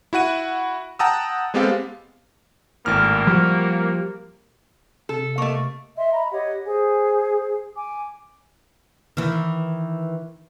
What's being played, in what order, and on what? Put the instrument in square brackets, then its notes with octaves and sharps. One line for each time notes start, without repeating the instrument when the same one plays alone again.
[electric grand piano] E4 F#4 F#5 D#7
F#5 G5 A5 A#5 D#6 E6
G#3 B3 C4 G4 A4 F5
[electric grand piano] G#1 A2 F6 [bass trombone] A#3
[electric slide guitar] F3 G4 [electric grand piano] G3 F#4
[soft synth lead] C3 [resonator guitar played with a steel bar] A4
[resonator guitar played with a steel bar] A3 A#3 [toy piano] D#5 C#6
[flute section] D#5 E5 C6
D#5 A#5 B5
G4 C#5 D#5 F#5
G#4 C5 G#5
G#5 D6
[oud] D#3 E3